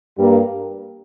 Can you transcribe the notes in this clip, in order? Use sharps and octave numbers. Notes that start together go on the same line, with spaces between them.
G2 G3 A#3